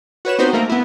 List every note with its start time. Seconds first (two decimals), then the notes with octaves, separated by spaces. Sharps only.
0.25 F#4 B4 C#5 E7
0.39 B3 C4 D#4 F#4 B4 C5
0.53 A3 A#3 A#4
0.69 B3 E4